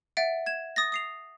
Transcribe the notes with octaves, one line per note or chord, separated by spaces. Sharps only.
E5 F#5 A6 D7
G#6 E7
D#6 A6 A#6
D#6 C7 F7